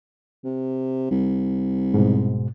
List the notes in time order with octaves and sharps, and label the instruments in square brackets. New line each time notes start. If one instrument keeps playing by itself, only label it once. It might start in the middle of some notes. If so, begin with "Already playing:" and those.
[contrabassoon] C3
C2
[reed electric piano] G#2 B2